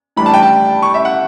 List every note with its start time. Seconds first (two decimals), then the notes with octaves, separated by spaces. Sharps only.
0.16 A2 E3 G3 D4 B5
0.26 A5
0.34 G5
0.42 A5
0.82 C#6
0.94 E5
1.05 F#5